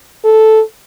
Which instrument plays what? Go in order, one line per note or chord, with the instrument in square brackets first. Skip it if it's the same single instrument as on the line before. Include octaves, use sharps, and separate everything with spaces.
[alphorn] A4